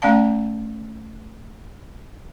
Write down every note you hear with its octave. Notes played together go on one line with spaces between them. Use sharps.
A3 C#4 D5 F5 A5